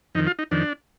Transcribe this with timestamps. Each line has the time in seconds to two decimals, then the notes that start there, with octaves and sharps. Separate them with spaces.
0.15 F2 D#4
0.18 D#3
0.27 F4
0.39 D#4
0.51 F2 D#3 D4